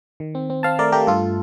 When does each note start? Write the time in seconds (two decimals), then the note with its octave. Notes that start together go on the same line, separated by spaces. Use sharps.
0.20 D#3
0.35 C4
0.50 C4
0.63 C4 F5 A5
0.79 A3 A#4 D5
0.92 A3 G4 A#4
1.07 G2 F4 A4